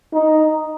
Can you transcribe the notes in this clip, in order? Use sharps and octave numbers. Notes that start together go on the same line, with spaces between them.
D#4